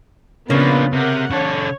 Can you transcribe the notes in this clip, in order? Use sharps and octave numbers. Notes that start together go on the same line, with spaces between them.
C#3 A#3 B3 D4 F4 B4
C3 A#4 F#5
C#3 A4 C#5